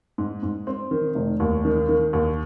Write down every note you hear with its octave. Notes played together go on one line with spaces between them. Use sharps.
G#2
G#2
C4
D#3
F1
D#2
D#3
D#3
D#2